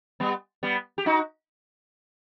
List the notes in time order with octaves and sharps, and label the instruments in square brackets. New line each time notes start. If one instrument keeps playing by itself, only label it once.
[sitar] G3 B3
G3 B3
G4
D#4 F#4